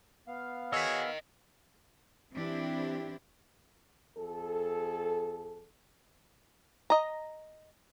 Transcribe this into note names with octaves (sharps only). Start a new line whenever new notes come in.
B3 F5
F#4 G#4 A#4 C#5 D#5 E6 B6
E3 C4 D4 E4 G4
F2 G#4 A4
D#5 A#5